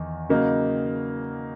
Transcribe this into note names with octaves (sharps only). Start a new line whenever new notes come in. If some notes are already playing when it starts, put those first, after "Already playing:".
Already playing: E2 D#3
C#3 F#3 A#3 D#4